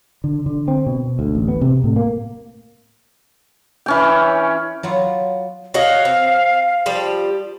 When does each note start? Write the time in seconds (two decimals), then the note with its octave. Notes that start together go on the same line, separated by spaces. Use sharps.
0.24 D3
0.46 D3
0.68 C4
0.86 B2
1.19 D2
1.35 A1
1.48 B3
1.61 C3
1.84 A2
1.96 A#3
3.86 E3 C#4 G5
4.83 F#3 B3 F4
5.74 F#4 C#5 D#5 F5
6.05 C4
6.86 F3 G3 G4